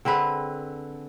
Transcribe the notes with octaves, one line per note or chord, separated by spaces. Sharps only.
D3 C4 G#4 B4